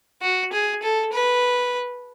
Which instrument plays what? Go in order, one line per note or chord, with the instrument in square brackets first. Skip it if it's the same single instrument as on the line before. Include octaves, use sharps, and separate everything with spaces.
[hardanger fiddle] F#4
G#4
A4
B4